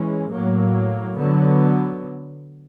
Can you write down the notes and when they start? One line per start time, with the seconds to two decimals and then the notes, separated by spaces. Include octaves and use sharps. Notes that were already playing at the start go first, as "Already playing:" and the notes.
Already playing: E3 G#3 C#4
0.30 A2 F#3 A#3
1.17 D3 F#3 B3